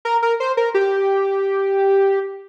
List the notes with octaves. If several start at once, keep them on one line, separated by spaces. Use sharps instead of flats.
A#4
A#4
C5
A#4
G4